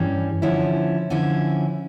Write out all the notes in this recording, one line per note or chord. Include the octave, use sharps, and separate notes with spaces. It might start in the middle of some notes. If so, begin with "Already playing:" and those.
Already playing: G2 E3 G3 C#4
D3 F3 C#4 E4
D3 F3 C#4 E4